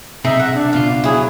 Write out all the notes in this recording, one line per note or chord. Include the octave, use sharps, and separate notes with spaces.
B1 C3 D#4 G#4 E5
F#5
D4
C#2 B2 F4 F5
F#3 E4 G#4